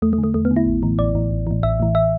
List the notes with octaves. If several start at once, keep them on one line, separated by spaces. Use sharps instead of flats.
E2 A3
A3
D3
A3
E2 A3
B3
D3
E4
A1
A2 E3
A1 D5
A2 E3
A1
A2 E3
A1 E5
A2 E3
E5